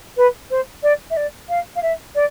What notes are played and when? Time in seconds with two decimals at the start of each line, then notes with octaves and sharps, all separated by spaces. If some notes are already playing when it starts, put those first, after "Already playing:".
0.17 B4
0.51 C5
0.83 D5
1.10 E5
1.17 D5
1.49 F5
1.76 F5
1.83 E5
2.15 D5